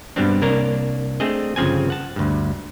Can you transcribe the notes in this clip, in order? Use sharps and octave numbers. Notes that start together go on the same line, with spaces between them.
G2 B2 G3 B3 C4 D4
C2 A#3 D4 A#4 C#5
A3 C4 D4 G#4 D#5
G1 C#3 F3 C4 G#5
F#5 A5
D2 G2